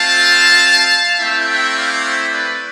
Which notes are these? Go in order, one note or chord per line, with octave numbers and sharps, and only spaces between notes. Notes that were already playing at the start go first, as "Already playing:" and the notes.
Already playing: A3 C4 F4 F5 A5
A3 C4 E4 E5 G5
E5 G5
D5 F5
C5 E5
B4 D5